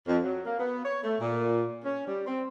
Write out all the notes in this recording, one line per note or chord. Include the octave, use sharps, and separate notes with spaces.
F2
F#3
A#3
B3
C#5
A3
A#2
C#4
G3
C4